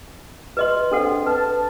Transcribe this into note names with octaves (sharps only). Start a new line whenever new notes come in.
B4 D#5 C6
C4 D4 A4 F#5
B4 A5